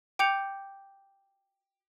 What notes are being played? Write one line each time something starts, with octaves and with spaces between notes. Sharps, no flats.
G5 D6 G6 C#7 F7